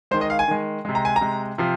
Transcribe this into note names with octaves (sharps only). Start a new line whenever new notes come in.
D#3 G#3 C5
D#5
F5
G#5
D#3 G#3
C3 G#3
A#5
G#5
A#5
C3 G#3
C3 F3